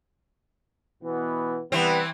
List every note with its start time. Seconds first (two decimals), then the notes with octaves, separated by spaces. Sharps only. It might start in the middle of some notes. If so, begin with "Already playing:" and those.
1.03 B2 E3 B3
1.72 C3 E3 G3 B3 C4